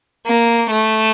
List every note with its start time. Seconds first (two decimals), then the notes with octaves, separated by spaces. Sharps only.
0.26 A#3
0.71 A3